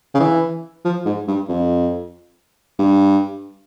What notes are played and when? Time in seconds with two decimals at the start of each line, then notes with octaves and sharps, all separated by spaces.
0.15 C#3
0.20 E3
0.85 F3
1.06 G#2
1.28 G2
1.49 F2
2.79 G2